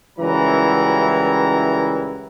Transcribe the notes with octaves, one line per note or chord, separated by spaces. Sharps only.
C#2 F#2 E3 G3 E4 A#5